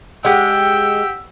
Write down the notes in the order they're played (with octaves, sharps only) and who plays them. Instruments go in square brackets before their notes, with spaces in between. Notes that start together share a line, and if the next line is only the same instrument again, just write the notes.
[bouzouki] G#3 [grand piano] G4 F#5 [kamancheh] G5 [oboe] E6